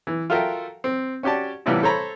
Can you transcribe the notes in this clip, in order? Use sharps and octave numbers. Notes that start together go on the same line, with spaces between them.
E3
F4 F#4 A4 A#4 E5 G5
C4
C#4 F#4 G4 D5 A5
A2 C3 E3 G3 B3 F4
A4 C5 C#5 A#5 B5